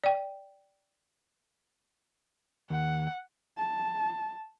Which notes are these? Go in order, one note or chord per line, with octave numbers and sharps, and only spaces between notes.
D5 G5
D#2 F#5
A5